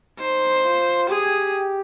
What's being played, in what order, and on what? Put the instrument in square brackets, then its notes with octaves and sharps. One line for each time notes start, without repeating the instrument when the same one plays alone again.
[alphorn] D#4 [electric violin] C5
[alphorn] F4
[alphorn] G4 [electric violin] G#4